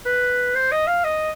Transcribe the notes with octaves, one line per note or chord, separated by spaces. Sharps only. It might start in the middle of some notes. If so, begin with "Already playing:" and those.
B4
C5
D#5
F5
D#5